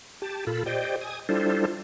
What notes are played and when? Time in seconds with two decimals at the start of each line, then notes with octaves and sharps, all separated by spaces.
0.22 G4 A5
0.47 A#2 F4 A4 B5
0.66 G4 C5 D5 D#5 G5
1.01 G#5 D#6
1.29 G3 D4 E4 F4 A4 C5